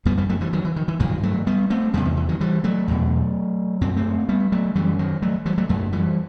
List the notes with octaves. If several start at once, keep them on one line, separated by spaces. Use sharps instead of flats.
F#2 G3 B3
G3 B3
F#3 A3
E3 G3
D#3 F#3
E3
D#3
E3
G2 D#3 F#3
F#3 A3
G3 B3
A3 C4
E2 C3 G3 B3
D#3
E3
D#3 F#3
E3 G3
F#3 A3
E2 B2
F#2 C4
A3 C4
G3 B3
F#3 A3
F#2 E3 G3
D#3 F#3
F#3 A3
E3 G3
F#3 A3
F#2 F#3 A3
E3 G3